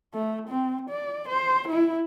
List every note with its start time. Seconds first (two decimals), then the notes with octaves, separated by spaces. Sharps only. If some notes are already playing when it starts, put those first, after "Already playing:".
0.14 A3
0.49 C4
0.89 D5
1.29 C5
1.68 E4